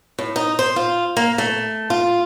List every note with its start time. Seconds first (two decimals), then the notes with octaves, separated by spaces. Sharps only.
0.19 A2
0.36 D#4
0.59 C5
0.76 F4
1.17 A#3
1.38 A3
1.90 F4